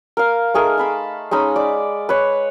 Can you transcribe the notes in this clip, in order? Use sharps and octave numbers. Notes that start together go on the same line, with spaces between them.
A#4 F5
A3 D#4 G#4 A#4
A5 B5 C6
G#3 C#4 D#4 B5
D5 D6
B4 C#5